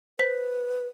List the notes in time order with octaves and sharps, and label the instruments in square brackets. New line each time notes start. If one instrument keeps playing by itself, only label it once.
[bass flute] B4 [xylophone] C5 B6